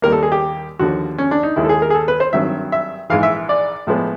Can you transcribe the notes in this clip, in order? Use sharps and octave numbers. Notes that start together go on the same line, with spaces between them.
D#2 D#3 G3 A#3 A#4
A4
G#4
G4
D#2 D3 F3 F#4
C#4
D4
D#4
D#2 D#3 G#3 E4
A4
G#4
A#4
G#4
A4
B4
C5
G#1 G2 D#3 F#3 E5
E5
A#1 G#2 E3 F5
E5
D5
A2 F3 G#3 B3